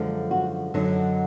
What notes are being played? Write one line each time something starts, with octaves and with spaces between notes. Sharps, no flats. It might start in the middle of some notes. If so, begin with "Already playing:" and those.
Already playing: F#2 D3 F3 G#3
F#4
F#2 D3 F#3 D#4